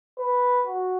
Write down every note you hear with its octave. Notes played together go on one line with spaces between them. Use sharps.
B4
F#4